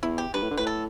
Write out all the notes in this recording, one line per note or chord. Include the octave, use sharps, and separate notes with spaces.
E2 E4
G4
G2 B4
A2
D3
A2 B4
A4